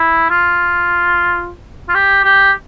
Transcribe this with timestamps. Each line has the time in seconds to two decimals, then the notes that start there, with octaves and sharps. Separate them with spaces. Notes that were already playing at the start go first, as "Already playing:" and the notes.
Already playing: E4
0.30 F4
1.89 F4
1.94 G4
2.25 G4